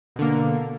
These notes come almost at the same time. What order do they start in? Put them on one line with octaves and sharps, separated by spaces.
B2 D3 A#3